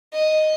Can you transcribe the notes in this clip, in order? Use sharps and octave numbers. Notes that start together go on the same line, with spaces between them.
D#5